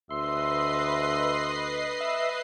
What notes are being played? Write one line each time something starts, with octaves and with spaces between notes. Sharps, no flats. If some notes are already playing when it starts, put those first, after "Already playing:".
D2 B4 D#5 E5 C6 C7
E5